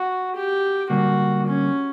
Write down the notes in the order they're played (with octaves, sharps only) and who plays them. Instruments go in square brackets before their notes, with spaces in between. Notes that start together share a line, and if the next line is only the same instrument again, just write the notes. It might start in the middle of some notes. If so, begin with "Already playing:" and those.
Already playing: [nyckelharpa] F#4
G4
[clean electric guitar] D3 G3 A#3 [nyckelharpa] F#4
[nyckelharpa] C#4